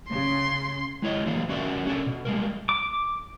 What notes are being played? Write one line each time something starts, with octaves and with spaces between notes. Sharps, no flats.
C#3 C6
G#3 E4 C#5 D#5
D3 E3 F#3 A#3 D4
C#4 F#4 A#4 D5 E5
A3 C#4 D4 A4 A#4
B2
G3 G#3 A#3 A#4
D6